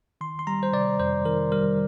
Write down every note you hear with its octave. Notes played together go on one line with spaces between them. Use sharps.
D#3 C6
C6
G3 A#5
C5
C3 D5
F2 C5
D#3 A#4
G3 A#4